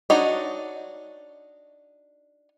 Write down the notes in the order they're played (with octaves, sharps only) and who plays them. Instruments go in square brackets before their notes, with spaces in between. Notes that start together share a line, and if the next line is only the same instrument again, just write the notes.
[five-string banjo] D4 D#4 F#4 C#5 D#5